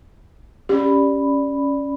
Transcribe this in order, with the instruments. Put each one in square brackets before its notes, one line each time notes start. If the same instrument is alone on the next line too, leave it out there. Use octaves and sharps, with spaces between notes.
[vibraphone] C#4 D5 B5 [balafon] G4